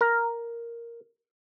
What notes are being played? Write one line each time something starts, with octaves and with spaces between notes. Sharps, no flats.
A#4